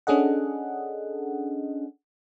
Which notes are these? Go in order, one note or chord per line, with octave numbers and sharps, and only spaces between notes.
C#4 D4 G#4 A4 D#5 F#5